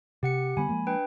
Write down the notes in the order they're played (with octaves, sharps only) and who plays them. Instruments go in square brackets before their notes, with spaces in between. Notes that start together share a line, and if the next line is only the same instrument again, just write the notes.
[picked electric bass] C3 [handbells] G4 F#5 C#7
[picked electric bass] D3 G3 B3 [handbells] G#5 B5
[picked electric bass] F3 G#3 A#3
[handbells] D4 B4 G5